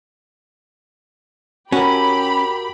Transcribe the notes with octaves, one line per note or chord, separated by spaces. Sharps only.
C#4 F#4 G4 A#4 B5